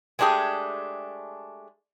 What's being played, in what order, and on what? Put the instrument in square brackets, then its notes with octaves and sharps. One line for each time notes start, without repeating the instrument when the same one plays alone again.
[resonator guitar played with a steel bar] G#3 A3 D4 G4 G#4